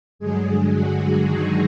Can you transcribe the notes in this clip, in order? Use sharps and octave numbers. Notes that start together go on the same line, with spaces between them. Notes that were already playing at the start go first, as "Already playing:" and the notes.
G2 D3 F#3 G#3 G#4
F#3 F#4
D#3 D#4